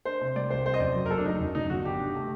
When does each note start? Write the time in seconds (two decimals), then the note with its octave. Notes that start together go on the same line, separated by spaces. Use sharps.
0.05 D4 C5
0.21 C3
0.36 G3 D5
0.50 C2 C5
0.66 C4 C5
0.74 D#5
0.80 F#2 D5
0.96 F#3
1.06 A#4
1.10 F#1 A4
1.18 D4
1.25 F#3 D#4
1.40 F#2
1.55 D3 D#4
1.70 G1 F#4
1.85 D4 G4
2.00 D3
2.15 A3